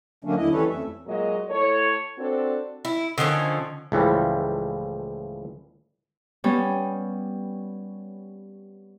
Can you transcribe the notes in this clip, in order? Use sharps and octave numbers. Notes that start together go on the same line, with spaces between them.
D3 F#3 A3 A#3 C#4 D4
D#2 D3 E4 D#5
E3 G3 C#4 A4 B4 C#5
F2 A3 E5
A#2 F#3 G#3 D#5
A2 A4 C#5
C4 D4 F#4 A4
E4
D3 D#3 F3 C#4
C#2 A2 E3 F3 G3
G3 B3 C#4